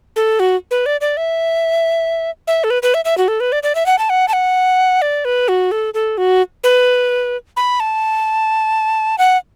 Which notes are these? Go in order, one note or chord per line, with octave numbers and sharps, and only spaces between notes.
A4
F#4
B4
D5
D5
E5
E5
A4
B4
B4
E5
E5
F#4
A4
B4
D5
D5
E5
F#5
A5
F#5
A5
F#5
D5
B4
F#4
A4
A4
F#4
B4
B5
A5
F#5